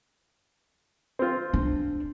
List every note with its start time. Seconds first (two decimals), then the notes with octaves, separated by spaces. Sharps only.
1.19 C4 F4
1.54 D4